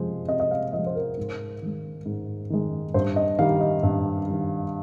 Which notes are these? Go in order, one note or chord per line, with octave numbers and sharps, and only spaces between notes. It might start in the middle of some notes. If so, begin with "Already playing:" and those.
Already playing: C3 F3 G#3 C5
C3 D#5
D#5
F5
F3 G#3 D#5
C5
A#4
G#2
D#3 G#3
G#2
D#3 G#3
G2 C5
D#5
D#3 G3 F5
D#5
G2
D#3 G3